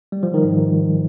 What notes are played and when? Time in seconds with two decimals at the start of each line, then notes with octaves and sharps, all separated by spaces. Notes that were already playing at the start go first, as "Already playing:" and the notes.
0.12 G3
0.23 F3
0.34 D#3
0.44 G#2